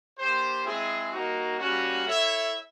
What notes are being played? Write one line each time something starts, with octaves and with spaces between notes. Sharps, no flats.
A#3 D4 G4 C5
G#3 C4 E4 G#4
G3 A#3 D#4 F#4
G3 A#3 C#4 F#4
E4 A4 C#5 E5